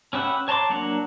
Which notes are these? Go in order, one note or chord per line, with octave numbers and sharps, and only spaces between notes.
C#4 G4 B4 E5 F#5
C#5 A5 A#5 C6 D6
F#3 A#3 D4 F#5 A#5